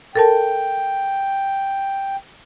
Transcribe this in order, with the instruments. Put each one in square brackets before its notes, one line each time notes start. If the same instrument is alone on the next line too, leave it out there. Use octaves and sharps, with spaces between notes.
[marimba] A4 A#4 A5 [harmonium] G5